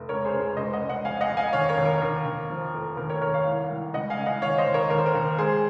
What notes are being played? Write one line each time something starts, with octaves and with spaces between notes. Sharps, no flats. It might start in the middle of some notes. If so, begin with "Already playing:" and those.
Already playing: F1
C#2 A#4 C#5
G#4 C5
C#2
A#4
C#2 C5 D#5
D#5 F#5
C#2
D#5 F#5
F2 F5 G#5
D#5 F#5
F2
F5 G#5
D#2 C#5 F5
A#4 C#5
D#2
A#4
D#2
D#2
F3
F1
D#2 A#4
A#4 C#5
D#2 A#4 C#5
C#5 F5
C2
C2
C#2 D#5 F#5
F5 G#5
C#2
D#5 F#5
D#2 C#5 F5
C5 D#5
D#2
A#4 C#5
D#2 A#4
C5
A#4
D#2
G#3 G#4 C5